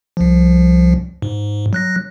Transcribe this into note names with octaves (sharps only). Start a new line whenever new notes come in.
C2 F3
G#2
F#3 F#6 A#6